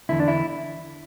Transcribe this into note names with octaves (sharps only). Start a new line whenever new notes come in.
E2 D3 E4
D4
E4